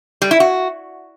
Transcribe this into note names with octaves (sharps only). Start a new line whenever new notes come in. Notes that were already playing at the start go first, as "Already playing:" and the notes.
G3
E4
F#4